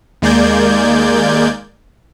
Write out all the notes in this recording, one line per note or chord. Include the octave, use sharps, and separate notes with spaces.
D#2 G#3 A#3 D5 G6 G#6